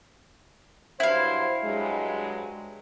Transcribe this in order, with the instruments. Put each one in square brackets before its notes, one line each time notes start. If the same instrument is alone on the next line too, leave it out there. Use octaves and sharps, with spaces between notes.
[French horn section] G2 F#3 C5 [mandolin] E4 F5
[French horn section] G2 F#3 G#3